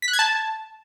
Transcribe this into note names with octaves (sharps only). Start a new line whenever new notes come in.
B6
F#6
G#6
A5